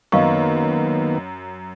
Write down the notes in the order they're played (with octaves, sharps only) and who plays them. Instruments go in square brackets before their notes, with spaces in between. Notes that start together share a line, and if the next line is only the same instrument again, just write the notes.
[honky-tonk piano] F#2 [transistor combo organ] D#3 A#3 B3 [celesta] D#5 F5 C#6